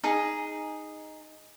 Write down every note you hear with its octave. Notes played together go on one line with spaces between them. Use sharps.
D#4 G#4